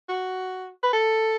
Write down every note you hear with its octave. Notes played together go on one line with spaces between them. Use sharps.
F#4
B4
A4